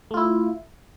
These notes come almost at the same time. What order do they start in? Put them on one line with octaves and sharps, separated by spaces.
A3 F4 E4